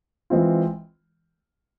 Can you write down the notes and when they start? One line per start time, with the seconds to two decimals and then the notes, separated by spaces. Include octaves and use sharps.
0.30 E3 G#3 C4 F4